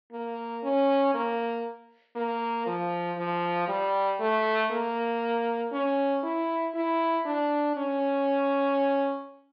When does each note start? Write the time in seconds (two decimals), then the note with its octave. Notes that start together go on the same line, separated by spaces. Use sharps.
0.12 A#3
0.64 C#4
1.14 A#3
2.16 A#3
2.67 F3
3.17 F3
3.68 G3
4.20 A3
4.71 A#3
5.72 C#4
6.23 E4
6.75 E4
7.26 D4
7.76 C#4